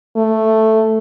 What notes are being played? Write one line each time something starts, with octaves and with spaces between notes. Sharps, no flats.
A3